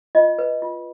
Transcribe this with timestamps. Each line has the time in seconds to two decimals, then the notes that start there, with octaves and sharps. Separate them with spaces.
0.15 F4 D#5
0.39 B4
0.62 F4